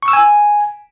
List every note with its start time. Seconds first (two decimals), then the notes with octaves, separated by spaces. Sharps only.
0.03 C#6
0.08 E6
0.13 G#5